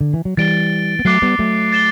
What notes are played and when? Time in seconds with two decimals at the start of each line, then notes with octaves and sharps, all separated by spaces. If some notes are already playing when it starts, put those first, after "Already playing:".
0.01 D3
0.14 E3
0.25 F#3
0.37 E3 G3 A6 D7 G7
0.99 B3
1.05 F#3 A3 D6 F#6 C7 G7
1.22 G3 B3
1.39 F#3 A3
1.72 A6 E7 G7